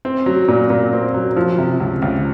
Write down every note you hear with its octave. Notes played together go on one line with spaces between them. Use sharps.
C4
F#3
A#2
A#2
C4
F#3
F3
C3
C#2
C#2